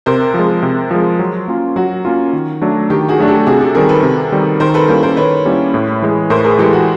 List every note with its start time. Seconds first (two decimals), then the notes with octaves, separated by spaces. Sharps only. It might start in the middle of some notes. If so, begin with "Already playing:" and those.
0.06 C3 A#4 C5
0.34 F3 G#3
0.62 C3
0.91 F3 G#3
1.19 F#3
1.48 A#3 C#4 F4
1.76 F#3 F#4
2.05 A#3 C#4 F4
2.33 D#3
2.62 F#3 A3 D4
2.90 D#3 G4
3.09 F#4 G#4
3.19 F#3 A3 D4
3.28 G4 A4
3.47 C3 F#4 G#4
3.61 G4 A4
3.75 D#3 G3 C4 G#4 A#4
3.89 A4 B4
4.03 C3
4.32 D#3 G3 C4
4.60 D#3 A#4 C5
4.74 A4 B4
4.88 G3 A#3 C#4 E4 A#4 C5
5.03 A#4 C5
5.17 D#3 B4 C#5
5.45 G3 A#3 C#4 E4
5.74 A2
6.02 E3 G#3
6.30 A2 A#4 C5
6.44 G#4 A#4
6.58 E3 G#3 G4 A4
6.73 F#4